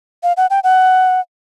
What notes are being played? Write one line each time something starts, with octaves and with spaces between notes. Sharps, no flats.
F5
F#5
G5
F#5